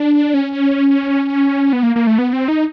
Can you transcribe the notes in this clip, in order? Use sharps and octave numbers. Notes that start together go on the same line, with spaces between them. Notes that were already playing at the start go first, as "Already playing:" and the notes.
Already playing: D4
C#4
B3
A#3
A#3
A3
B3
C4
D#4